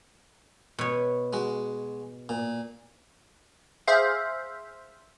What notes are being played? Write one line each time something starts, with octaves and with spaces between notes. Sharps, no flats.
B2 C#5
G#3 F#4
A#2
G#4 C5 E5 F5